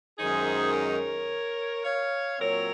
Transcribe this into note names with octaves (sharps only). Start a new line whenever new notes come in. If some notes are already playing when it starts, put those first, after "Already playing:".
F#2 D#3 G#3 D#4 G#4 C5
A#4 C#5
C#5 F5
A#2 F#3 C4 A#4 C#5